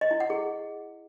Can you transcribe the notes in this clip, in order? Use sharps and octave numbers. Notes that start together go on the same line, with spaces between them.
D#5
E4
F#5
G#4